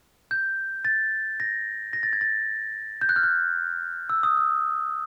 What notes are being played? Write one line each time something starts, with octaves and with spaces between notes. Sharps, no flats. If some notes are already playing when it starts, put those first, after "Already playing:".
G6
A6
A#6
A#6
A6
G#6
A6
G6
F#6
F6
F#6
E6
D#6
E6